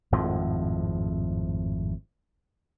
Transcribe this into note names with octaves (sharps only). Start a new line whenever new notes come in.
G#1 F2 A2 F3